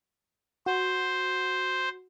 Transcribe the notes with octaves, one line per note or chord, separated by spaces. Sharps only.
F#4 C5